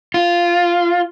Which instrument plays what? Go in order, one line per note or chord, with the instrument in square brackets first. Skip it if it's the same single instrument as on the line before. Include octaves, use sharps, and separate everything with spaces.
[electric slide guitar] F4